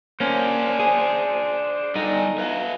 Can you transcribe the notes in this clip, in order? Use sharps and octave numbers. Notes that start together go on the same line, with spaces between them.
A#3 C#4 D4 C5
G#4
G3 D#4 A4 D5
B4 E5 F5